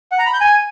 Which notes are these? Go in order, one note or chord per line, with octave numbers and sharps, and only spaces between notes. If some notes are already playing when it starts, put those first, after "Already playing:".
F#5
A#5
B5
G6
G#5